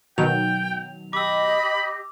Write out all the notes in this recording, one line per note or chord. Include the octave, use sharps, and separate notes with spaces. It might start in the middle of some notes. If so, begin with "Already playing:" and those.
B2 D#3 F#3 G5 F7
G4 D#5 B5 D6 E6